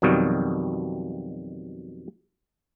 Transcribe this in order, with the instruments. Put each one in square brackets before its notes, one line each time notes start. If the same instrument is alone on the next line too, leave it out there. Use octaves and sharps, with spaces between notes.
[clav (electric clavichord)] F2 B2 D#3 F#3 G3